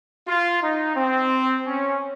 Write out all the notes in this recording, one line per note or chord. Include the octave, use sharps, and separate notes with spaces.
F4
D#4
C4
C#4